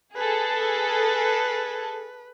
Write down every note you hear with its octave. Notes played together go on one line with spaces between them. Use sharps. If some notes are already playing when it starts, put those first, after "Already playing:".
G#4 A4 B4